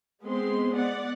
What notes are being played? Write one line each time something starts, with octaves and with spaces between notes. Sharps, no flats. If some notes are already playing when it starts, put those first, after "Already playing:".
G#3 B3 C4 C6
B3 D5 F#5